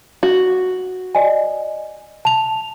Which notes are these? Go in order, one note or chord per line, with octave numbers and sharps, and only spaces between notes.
F#4
D5 D#5 G#5
A5 F7